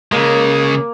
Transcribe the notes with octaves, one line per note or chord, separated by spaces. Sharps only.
C#3 G#3 A#3